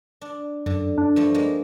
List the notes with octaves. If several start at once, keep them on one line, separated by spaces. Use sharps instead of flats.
D4
F#2 D3
D4
G2 F3 A3
G#3 A#3